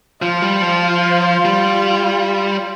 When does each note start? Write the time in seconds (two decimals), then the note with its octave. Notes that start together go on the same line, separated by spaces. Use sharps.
0.22 F3 F4
0.42 G3
0.62 F3
1.45 G3